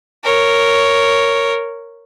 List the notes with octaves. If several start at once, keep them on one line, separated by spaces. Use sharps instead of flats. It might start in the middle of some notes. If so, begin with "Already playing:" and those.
A#4 C#5